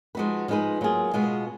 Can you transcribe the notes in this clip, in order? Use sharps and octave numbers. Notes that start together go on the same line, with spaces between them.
F3 G#3 D#4 F#4 B4
F3 G#3 D#4 G#4 B4
F#3 A#3 F4 G#4
B2 G#3 B3 F4